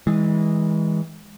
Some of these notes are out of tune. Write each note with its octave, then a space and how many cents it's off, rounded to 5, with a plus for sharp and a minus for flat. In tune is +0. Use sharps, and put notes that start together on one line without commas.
E3 -30 G#3 -20